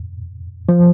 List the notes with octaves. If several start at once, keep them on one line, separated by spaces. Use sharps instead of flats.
F3